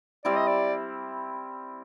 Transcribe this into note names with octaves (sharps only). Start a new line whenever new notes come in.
G3 C4 E4 D5
D#5
D5